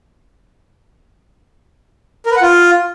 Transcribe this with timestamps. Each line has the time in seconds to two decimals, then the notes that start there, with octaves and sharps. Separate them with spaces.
2.26 A#4
2.31 B4
2.36 F#5
2.42 F4